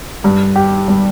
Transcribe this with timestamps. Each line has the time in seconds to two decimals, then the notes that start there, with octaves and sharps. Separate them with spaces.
0.24 G2
0.56 G4
0.88 G3